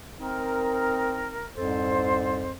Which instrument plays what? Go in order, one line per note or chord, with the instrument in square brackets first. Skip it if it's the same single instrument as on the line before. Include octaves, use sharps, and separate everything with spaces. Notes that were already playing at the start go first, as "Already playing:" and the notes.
[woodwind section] C4 D#4 A#4
C2 F2 G#2 A4 C5